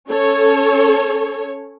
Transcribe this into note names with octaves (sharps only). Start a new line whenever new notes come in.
C#4 A4 C#5